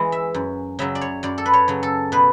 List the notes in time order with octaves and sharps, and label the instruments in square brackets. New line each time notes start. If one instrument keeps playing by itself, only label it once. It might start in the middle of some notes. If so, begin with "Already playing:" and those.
Already playing: [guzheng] E3 G#3
E5
F#2
C#3 F#3 E5
D5
C#5
F#2 D5
A4
B4
C#5
C#3 F#3
A4
B2 B4